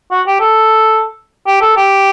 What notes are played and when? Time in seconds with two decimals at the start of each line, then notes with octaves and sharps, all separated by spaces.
0.11 F#4
0.27 G4
0.41 A4
1.46 G4
1.61 A4
1.77 G4